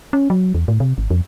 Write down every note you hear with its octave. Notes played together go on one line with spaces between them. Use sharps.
C#4
F#3
E2
A2
C3
G#1
F2